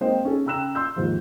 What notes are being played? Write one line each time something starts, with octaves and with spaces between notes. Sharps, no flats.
G#3 A#3 C4 C5 D#5 G5
C#4 G#4 A4
C#3 G5 A#5 E6 F#6 E7
C6 E6 G6
D#2 G#2 F3